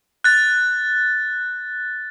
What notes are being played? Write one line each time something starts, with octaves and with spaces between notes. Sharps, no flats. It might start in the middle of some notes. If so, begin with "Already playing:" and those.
F#6 A6